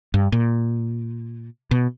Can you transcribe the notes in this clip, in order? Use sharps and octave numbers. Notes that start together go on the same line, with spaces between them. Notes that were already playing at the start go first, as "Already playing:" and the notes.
G2
A#2
B2